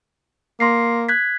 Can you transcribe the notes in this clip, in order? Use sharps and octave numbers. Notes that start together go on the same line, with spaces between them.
A#3 C6 A#6 C7
F#6 G#6 B6